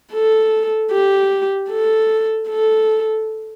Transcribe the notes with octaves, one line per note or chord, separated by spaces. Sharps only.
A4
G4
A4
A4